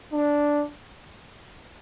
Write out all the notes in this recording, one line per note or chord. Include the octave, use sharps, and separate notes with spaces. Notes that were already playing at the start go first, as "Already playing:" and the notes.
D4